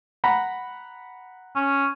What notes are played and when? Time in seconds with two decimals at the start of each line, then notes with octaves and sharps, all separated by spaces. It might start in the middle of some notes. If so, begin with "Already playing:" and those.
0.24 F#5 A#5 B5
1.56 C#4